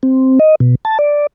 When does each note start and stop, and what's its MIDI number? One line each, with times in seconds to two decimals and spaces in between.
0.03 0.39 60
0.40 0.55 75
0.60 0.75 47
0.85 0.98 81
0.99 1.27 74